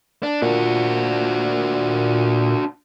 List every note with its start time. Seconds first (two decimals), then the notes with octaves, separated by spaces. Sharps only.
0.23 D4
0.42 A#2 D4 F#4